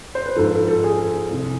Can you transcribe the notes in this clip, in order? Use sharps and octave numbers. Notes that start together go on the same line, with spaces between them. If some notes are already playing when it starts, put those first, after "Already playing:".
C5
B4
G#2 F3 A4
A4
A4
G#4
C2 C3 F3